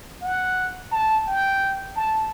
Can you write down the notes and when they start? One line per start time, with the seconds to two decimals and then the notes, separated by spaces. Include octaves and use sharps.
0.22 F#5
0.92 A5
1.27 G5
1.96 A5